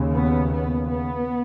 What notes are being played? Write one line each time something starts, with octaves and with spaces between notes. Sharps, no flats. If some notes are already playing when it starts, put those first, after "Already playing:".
Already playing: D#2 C#3
B3
B3
B3